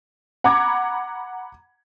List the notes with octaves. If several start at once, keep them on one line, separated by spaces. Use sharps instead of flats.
F#5 A#5 B5 D6 G#6